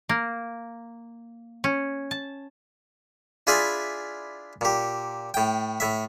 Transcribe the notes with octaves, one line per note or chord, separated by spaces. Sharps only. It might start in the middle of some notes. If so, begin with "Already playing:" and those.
A#3
C#4
A5
D4 E4 F4 G#4 G#5 B5
A#2 G4
A2 G5
A2 E5